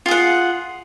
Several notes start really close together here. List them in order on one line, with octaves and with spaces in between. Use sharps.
F4 G#4 F#5